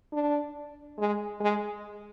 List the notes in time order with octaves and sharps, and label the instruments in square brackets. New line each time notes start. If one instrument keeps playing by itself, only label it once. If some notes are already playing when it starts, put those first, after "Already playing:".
[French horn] D4
G#3
G#3